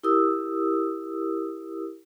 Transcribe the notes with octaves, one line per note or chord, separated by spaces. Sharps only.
E4 G4 A#4 D#6 E6